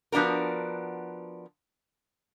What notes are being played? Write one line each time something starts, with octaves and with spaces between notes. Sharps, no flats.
F3 B3 D4 F#4 A#4